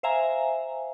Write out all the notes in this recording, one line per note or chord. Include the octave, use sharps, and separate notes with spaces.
C5 E5 F5 G#5 A#5